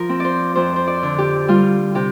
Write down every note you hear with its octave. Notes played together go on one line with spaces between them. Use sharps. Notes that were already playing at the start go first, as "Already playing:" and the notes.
Already playing: F3 A#4
C4
C5 D5
F2 C5
C5
D5
D3
G4
G3 F4
C3 G4